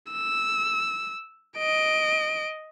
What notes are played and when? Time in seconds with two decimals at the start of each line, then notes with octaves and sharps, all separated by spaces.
0.13 E6
1.58 D#5 D7